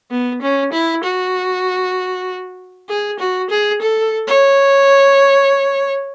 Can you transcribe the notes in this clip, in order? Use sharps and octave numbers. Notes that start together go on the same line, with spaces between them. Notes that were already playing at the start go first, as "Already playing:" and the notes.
B3
C#4
E4
F#4
G#4
F#4
G#4
A4
C#5